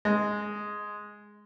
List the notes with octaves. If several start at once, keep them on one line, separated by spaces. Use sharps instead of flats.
G#3